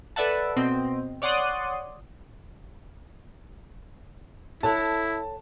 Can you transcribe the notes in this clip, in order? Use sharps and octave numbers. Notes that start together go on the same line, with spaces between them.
A4 B4 D5 E5 F#5 A5
B2 C4 D#5
C#5 D5 F#5 C6 D#6
E4 A4 C#5 F#5 A5